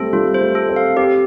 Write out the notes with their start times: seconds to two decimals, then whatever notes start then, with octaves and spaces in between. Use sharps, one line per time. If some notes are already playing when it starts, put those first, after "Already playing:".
Already playing: G3 A3 C4 A4
0.13 G3 F4
0.34 C5
0.41 A3
0.55 A4
0.69 C4
0.76 F5
0.97 C4 G4